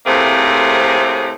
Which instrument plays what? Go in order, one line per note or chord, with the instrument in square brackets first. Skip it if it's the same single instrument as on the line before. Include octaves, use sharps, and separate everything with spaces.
[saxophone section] A2 C3 A3 A#3 C4 G#4